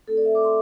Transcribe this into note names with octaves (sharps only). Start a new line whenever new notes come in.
A3 C4 E4 A4
D5
E5
D6
C6